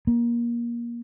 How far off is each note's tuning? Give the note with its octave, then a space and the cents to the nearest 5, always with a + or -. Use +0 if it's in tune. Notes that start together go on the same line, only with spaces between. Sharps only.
A#3 +25